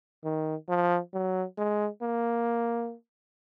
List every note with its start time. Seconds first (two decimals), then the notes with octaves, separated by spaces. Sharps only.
0.24 D#3
0.69 F3
1.14 F#3
1.58 G#3
2.02 A#3